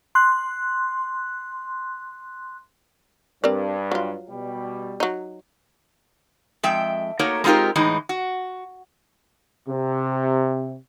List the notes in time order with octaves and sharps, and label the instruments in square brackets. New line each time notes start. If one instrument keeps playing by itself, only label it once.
[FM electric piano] C6 F#6
[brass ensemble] G2 [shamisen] C4 A#4 D5
[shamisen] F#3 F4
[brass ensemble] B2 G3
[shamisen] F#3 D#4
[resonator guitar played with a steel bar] F2 G#3 E5 G5
A3 A#3 D#4 F#4 A#4 C#5
G#3 C4 D#4 F4 G4 A#4
A2 E3 G#3 D#4
F#4
[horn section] C3